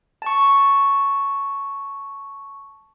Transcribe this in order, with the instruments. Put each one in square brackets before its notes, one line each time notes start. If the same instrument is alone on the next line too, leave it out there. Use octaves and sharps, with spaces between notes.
[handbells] A5 C#6